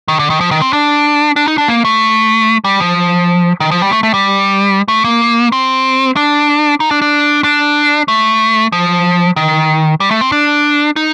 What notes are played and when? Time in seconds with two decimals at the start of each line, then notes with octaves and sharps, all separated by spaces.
0.08 D#3
0.19 D3
0.30 D#3
0.41 F3
0.51 D#3
0.62 C4
0.73 D4
1.36 D4
1.48 D#4
1.58 D4
1.68 A#3
1.85 A3
2.64 G3
2.80 F3
3.60 D#3
3.71 F3
3.82 G3
3.92 A3
4.03 A3
4.14 G3
4.88 A3
5.04 A#3
5.52 C4
6.16 D4
6.80 D#4
6.91 D4
7.02 D4
7.44 D4
8.08 A3
8.72 F3
9.36 D#3
10.00 G3
10.11 A3
10.21 C4
10.32 D4
10.96 D#4